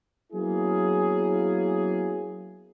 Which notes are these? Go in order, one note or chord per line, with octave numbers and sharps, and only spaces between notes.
F#3 A#3 B3 C#4 E4 G#4